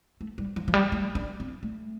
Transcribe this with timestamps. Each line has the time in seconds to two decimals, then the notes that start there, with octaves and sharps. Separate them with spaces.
0.21 A3
0.38 G3
0.56 F3
0.68 F3
0.74 G3
0.92 A3
1.15 D4
1.40 C4
1.63 A3